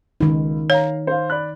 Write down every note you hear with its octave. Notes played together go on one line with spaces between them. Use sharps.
C#2 D#3 D#4
C#5 F5 A#5
C5 F5
D5 B5 F#6